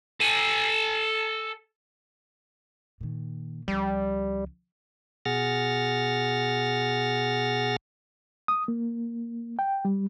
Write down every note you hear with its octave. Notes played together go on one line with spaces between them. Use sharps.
A4 G#5
A#2 D#3
C#2 F3 G3
B2 G#4 F#5 F6 A6 A#6
D#6
A#3
G5
G3